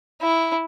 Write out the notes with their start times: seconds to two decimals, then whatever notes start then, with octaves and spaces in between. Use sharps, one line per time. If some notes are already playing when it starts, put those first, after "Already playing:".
0.21 E4